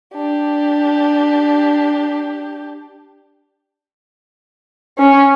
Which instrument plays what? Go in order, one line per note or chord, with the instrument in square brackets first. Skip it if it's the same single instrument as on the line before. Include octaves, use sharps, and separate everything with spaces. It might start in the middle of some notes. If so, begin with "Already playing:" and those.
[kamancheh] D4 G4
C#4